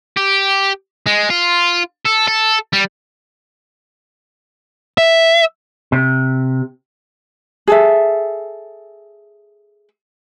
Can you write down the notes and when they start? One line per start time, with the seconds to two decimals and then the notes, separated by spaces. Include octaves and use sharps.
0.17 G4
1.06 G#3
1.30 F4
2.06 A4
2.28 A4
2.73 G3
4.98 E5
5.92 C3
7.68 G#4 A4 E5